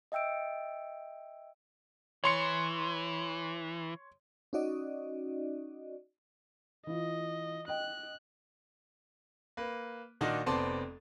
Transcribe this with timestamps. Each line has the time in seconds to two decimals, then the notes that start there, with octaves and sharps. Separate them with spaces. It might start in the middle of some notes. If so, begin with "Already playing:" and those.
0.12 D#5 E5 G5 E6 D7
2.24 E3 C#5 C6 C#7
4.53 C#4 D#4 F#4 D5 D#5
6.87 E3 F4 D#5
7.68 D#5 G5 F#6
9.57 A#3 B4
10.21 A#2 D#3 D4 D#4 F#4
10.46 F1 B3 C4 D5 A5 C6